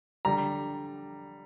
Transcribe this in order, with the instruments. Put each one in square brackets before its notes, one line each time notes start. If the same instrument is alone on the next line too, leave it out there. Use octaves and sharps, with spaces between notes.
[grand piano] D3 G3 A#5